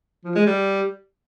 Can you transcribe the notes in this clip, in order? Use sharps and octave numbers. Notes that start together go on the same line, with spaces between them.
F3
G#3
G3